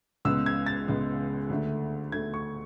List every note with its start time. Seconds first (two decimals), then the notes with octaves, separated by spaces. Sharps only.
0.25 C#2 C#3 G#3 B3 E6
0.46 G#6
0.66 A6
0.88 C#2 C#3 G#3 B3
1.50 D2 D3 A3
2.12 D2 D3 A3 G#6
2.34 C#6